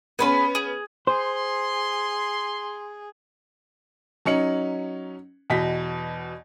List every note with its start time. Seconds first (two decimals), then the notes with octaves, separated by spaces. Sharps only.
0.19 B3 C#4 G#4 B4 C6
0.55 G#4
1.07 G#4 C5 C6
4.25 F#3 C#4 D#4 C#7 F#7
5.50 E2 B2 D#5 B6